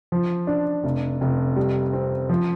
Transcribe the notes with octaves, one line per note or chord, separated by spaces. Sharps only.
F3
D4
F1
F1
G3
C4
F3